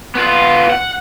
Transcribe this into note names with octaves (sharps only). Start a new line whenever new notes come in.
B3 F4
F#5